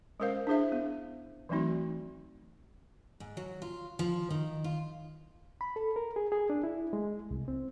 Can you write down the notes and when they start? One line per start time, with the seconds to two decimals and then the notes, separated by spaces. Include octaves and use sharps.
0.20 G#3 C#4 A#4 C5 F5
0.47 D4 E4 G#4 C5 E5
0.72 B3
1.49 E3 F#3 A3 C4 D#4 F#4
3.20 G#2
3.37 F#3
3.62 F4
3.99 F3
4.30 D#3
4.64 F4
5.61 B5
5.76 A4
5.96 A#4
6.16 G#4
6.32 G#4
6.50 D4
6.64 E4
6.93 G#3
7.31 C2
7.48 C4